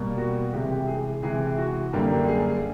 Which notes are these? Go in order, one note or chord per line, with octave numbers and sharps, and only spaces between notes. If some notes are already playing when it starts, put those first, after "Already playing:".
Already playing: B2 G3 A#3
F#4
C3 E3 G#3 G4
G#4
C3 E3 G#3 G#4
F#4
F#2 D3 G3 A#3 G4
G#4